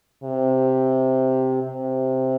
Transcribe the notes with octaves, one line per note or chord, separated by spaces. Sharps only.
C3
C3